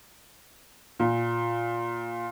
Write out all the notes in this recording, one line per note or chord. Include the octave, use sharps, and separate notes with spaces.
A#2